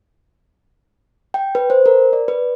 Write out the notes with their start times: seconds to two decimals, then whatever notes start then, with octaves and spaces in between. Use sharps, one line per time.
1.34 G5
1.55 B4
1.70 C5
1.86 A#4
2.13 D5
2.28 B4